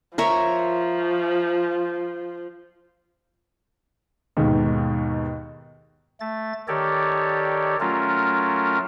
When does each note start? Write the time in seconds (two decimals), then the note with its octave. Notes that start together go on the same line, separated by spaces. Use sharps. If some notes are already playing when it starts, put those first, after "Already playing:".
0.18 F3 A#4 C#5 E5
4.37 D#2 G#2 B2 D#3
6.20 A3 A6
6.68 D#3 G4 A4 C#5 D5
7.80 F#3 A3 C#4 F4 A4 A#4